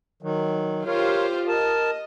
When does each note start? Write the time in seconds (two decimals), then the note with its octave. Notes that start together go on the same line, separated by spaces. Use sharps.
0.23 D#3 F#3
0.86 F4 G4 A#4 C5 C#5
1.48 A#4 D#5 A5